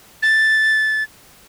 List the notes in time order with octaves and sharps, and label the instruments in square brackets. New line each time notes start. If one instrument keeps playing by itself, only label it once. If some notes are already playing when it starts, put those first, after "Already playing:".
[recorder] A6